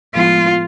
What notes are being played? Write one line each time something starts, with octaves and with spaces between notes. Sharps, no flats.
A2 F3 G#3 B3 F4